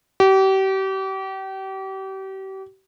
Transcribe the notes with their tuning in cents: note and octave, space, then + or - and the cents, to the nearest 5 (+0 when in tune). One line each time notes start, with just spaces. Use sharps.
G4 -35